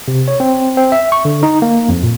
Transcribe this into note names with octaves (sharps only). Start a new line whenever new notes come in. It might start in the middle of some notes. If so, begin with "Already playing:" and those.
C3
C#5
C4
C4
E5
C#6
D3
D#4
A#3
F2
A#2